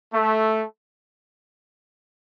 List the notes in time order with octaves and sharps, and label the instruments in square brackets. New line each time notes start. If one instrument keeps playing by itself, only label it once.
[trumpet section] A3